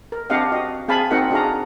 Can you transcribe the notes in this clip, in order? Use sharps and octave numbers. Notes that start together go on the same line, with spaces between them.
A#4
C4 D4 G4 D#5 F5 F#5
F#4 D#5
C4 G#4 F5 G#5 A5 B5
C4 D#4 F#4 A#4 D#5 F#5
D4 F#4 G#4 F5 A#5